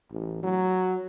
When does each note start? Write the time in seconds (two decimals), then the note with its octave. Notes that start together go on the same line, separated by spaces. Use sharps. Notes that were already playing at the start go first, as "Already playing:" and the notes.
0.12 A1
0.43 F#3